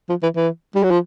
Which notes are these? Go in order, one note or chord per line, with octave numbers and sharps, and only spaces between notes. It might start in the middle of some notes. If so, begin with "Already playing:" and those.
F3
E3
E3
G3
F#3
F3